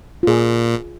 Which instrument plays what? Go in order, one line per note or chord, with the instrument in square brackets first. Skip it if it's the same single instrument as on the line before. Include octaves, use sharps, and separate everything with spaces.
[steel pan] F4
[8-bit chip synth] A#2 [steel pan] G#4